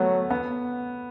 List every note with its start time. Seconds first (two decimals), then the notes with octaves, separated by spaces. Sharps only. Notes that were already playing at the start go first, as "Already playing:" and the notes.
Already playing: F#3 A3 B3
0.31 B3